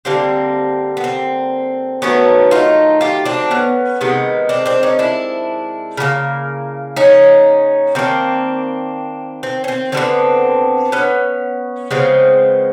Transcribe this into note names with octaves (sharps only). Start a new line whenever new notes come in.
D3 G3 A#3 C4
B3
C4
D#3 F#3 A3 B3 C#4
D#4 F4
F4 G4
C4 D4
B3 C#4
C3 D#3 G#3 B3
C4 D4
C4 D4
C#4 D#4
D4 E4
C#3 F3 A#3
C#4 D#4
D#3 G3 A#3 C4 D4
C4
C#4
C4
D3 G3 C4 D4
B3
B3 C#4
C#3 F3 G#3 B3 C4